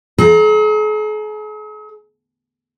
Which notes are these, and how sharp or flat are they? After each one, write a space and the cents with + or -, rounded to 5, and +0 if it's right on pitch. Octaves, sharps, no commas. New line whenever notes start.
G#4 +45 A#5 +0